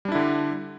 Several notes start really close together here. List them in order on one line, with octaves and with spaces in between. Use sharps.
G3 D4 E4 D3